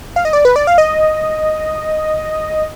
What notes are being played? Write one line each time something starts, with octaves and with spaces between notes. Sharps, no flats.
F5
D#5
D5
B4
D5
F5
D#5